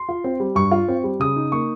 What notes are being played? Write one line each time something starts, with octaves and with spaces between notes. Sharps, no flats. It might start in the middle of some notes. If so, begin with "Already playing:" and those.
Already playing: C6
F4
C4
G3
G2 C#6
F4
C4
G3
C#3 D#6
D#4
A#3 C#6